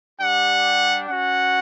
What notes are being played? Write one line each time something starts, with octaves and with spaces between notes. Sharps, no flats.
G3 D4 G4 F#5
C#4 F#4 F#5